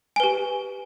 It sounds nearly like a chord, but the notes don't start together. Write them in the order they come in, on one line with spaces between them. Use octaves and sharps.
G#5 B4 G4